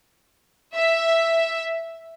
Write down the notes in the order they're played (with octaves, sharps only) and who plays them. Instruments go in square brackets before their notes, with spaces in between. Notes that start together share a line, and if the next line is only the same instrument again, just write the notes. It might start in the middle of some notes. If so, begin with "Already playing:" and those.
[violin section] E5